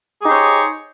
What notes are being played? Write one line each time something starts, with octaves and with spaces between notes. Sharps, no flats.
D#4 G4 G#4 C5 C#5